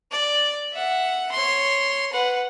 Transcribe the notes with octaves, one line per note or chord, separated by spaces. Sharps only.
D5
E5 F#5
C#5 C6
B4 F#5